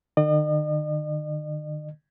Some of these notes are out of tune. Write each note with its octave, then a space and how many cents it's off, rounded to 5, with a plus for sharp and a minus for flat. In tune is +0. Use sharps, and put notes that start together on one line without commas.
D#3 -45 D#5 -45